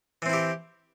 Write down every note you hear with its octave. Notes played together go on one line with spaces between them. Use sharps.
E3 C4 E4 G4